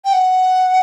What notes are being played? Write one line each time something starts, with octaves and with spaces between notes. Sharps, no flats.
G5
F#5